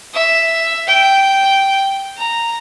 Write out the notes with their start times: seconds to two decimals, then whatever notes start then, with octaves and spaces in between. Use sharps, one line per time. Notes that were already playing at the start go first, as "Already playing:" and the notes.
0.14 E5
0.87 G5
2.17 A#5